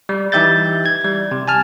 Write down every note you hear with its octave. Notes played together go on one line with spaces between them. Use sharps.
G3
E3 D#4 G4 E5 G6 A6
G#6
G3
C3
G#5 A5 F6